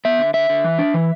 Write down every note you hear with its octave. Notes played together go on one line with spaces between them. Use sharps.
B3 E5
D3
D3 E5
D3
E3
D4
E3